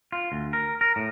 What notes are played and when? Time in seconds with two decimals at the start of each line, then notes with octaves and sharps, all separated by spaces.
0.12 F4
0.32 D2
0.53 A#4
0.81 A#4
0.96 A2